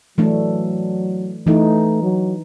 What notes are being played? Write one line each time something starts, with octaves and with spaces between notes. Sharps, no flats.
E3 F#3 A3 D4
E3 A3 D#4
F#3